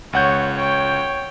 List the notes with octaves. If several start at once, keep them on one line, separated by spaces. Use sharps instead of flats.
C#2 C#5 F#5 G6
C#5 G5